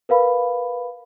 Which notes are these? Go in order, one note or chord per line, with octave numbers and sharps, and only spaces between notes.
A#4 B4 F5 B5